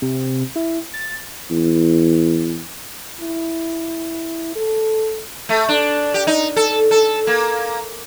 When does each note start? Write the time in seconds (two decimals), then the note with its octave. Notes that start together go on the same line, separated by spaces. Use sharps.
0.02 C3
0.56 E4
0.94 A6
1.51 E2
3.21 E4
4.56 A4
5.49 A3
5.68 D4
6.14 G4
6.27 D#4
6.56 A4
6.91 A4
7.27 A#3